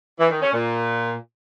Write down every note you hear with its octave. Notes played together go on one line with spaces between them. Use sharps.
E3
D#3
C#4
A#2